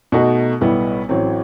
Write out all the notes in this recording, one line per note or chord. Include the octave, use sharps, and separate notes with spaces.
B2 A3 D#4 F#4
B1 A2 G3 B3 E4
A1 A2 F#3 C4